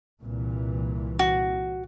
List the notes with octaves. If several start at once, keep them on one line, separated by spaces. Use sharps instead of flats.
C2 A#2 E3
F#4